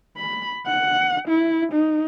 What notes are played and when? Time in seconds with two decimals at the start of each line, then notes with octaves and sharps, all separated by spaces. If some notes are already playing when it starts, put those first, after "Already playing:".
0.17 B5
0.67 F#5
1.28 E4
1.72 D#4